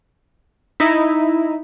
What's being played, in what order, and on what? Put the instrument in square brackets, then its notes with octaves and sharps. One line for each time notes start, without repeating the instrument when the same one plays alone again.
[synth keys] D#4 E4